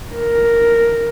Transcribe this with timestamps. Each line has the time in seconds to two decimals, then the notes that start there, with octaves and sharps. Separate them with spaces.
0.15 A#4